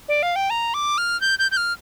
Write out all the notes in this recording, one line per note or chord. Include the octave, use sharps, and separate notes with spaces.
D5
F5
G5
A#5
D6
F6
G6
G6
G6
F6